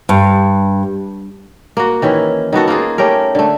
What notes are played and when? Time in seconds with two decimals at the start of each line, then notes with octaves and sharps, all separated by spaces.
0.09 G2
1.77 A#3 F#4
2.02 D#3 E3 C#4 E4
2.53 D#3 B3 F#4 A4
2.68 A#3 D#4 F4 G#4
2.98 A3 C#4 G4 A#4
3.35 D3 A3